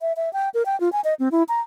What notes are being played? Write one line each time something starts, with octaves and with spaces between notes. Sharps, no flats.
E5
E5
G5
A#4
G5
F4
G#5
D#5
C4
E4
A#5